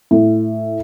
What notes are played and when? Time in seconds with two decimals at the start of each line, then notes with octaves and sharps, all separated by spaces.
0.11 A2